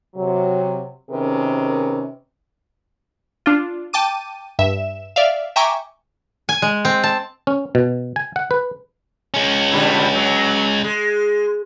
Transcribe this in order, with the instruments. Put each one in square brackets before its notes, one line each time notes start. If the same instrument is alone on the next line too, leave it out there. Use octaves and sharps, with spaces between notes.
[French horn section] C3 F#3
C3 D#3 C#4 G#4 A#4 B4
[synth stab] D4 F4
G5 A5 D6 D#7
G2 E5 E7
D5 E5 F5
E5 G5 G#5 A#5 C#6 D6
[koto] G#5
G#3
C4
A5
[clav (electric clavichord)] C#4
B2
G#5
F#5
B4
[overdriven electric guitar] G#3 C#4
[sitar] A#2 D3 G3
F#3
G#3